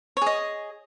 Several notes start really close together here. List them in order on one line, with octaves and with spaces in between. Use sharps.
C#5 G#4 D#5